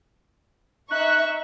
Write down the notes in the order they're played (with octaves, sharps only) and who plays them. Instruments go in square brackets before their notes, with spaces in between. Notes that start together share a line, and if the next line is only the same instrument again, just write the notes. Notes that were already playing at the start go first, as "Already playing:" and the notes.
[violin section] D#4 E5 C#6 [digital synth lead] F#6